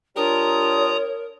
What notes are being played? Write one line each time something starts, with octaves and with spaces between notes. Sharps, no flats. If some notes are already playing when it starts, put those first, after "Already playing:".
G3 D4 F4 A#4 C#5 A#5 D#6